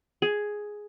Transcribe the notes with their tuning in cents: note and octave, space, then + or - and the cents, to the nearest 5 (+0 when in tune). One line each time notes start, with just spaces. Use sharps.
G#4 +5